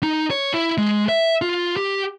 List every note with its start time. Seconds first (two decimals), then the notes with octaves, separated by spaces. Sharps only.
0.03 D#4
0.31 C#5
0.54 E4
0.78 G#3
1.09 E5
1.42 F4
1.77 G4